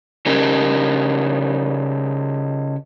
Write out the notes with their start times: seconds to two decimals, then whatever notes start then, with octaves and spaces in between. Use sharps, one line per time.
0.26 C#3 C#4 D#4 G4 A#4